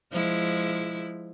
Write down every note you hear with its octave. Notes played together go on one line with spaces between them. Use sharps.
F3 G#3 E4